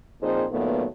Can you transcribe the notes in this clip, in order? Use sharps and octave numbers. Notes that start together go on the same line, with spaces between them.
A#2 F3 C4 D#4 G#4 C5
A#2 D#3 F#3 A3 B3